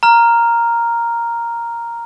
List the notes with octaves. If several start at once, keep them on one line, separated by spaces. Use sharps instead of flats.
A#5 F6